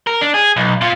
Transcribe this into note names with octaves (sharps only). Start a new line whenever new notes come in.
A#4
D4
G#4
B1
A#2 F4